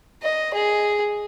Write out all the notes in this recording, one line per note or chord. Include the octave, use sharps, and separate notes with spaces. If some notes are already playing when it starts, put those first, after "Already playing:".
D#5
G#4